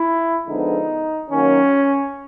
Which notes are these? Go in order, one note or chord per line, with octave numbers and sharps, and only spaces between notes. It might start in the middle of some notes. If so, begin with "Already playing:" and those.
Already playing: E4
D3 F3 G#3 B3 D#4
D#3 F#3 A#3 C#4